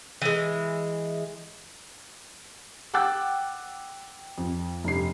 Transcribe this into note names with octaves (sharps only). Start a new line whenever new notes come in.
E3 G#3
F#5 G5 D6 E6 F#6 A6
F2
F1 G2 C7